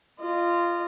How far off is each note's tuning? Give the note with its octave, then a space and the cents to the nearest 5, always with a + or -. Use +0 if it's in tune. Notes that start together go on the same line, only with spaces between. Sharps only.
F4 -15 D#5 -30